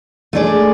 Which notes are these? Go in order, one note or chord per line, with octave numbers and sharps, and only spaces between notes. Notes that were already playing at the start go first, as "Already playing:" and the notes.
A3 D4 G#4 D5